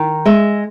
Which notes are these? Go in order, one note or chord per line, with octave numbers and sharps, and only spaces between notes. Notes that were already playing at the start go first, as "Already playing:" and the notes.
Already playing: D#3
G#3 E5